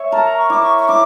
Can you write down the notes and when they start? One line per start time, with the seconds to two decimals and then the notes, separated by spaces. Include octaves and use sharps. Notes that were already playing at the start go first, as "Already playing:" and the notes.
Already playing: C#5 E5
0.12 A#4 A5
0.25 A#5
0.38 C#6
0.50 E4 D6
0.62 C#6
0.79 C#6
0.88 E4 D6